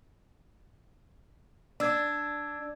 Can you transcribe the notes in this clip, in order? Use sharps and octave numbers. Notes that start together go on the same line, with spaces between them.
D4 D5 E6 G#6